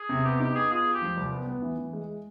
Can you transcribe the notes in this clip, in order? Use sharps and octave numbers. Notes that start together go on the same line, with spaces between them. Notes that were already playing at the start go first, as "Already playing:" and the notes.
Already playing: G#4
C3
B3 G4
D#4 G4
B3 G#4
F4 G#4
F4
G4
F3
C2
B3
B3
E3
E3
G#3